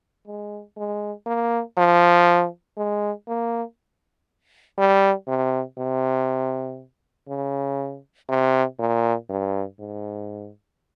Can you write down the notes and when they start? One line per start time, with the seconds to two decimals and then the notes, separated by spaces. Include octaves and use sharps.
0.27 G#3
0.77 G#3
1.26 A#3
1.77 F3
2.77 G#3
3.28 A#3
4.78 G3
5.27 C3
5.78 C3
7.28 C#3
8.28 C3
8.79 A#2
9.29 G2
9.79 G#2